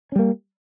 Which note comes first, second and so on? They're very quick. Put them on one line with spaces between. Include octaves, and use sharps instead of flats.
C#4 G3 A#3